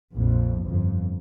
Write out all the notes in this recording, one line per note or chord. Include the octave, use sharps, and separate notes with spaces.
A#1 F2
G1 F2